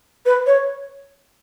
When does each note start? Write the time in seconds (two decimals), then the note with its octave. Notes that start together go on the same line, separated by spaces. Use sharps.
0.26 B4
0.47 C#5